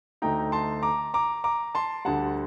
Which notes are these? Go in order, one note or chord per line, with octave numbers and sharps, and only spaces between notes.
D2 D3 A3 D#4 G5 A#5
A5 C6
A#5 D6
A#5 D6
A#5 D6
A5 C6
D2 D3 G3 F#5 A5